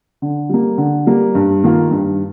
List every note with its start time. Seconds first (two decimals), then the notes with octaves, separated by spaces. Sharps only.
0.22 D3
0.49 G3 A#3
0.78 D3
1.07 G3 A#3
1.35 G2
1.64 D#3 A#3 F4
1.91 G2